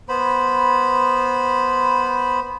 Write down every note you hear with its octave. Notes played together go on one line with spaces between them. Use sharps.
B3 C5 B5